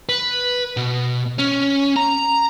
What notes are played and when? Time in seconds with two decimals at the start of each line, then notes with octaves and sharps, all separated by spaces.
0.09 B4
0.77 B2
1.38 C#4
1.96 A#5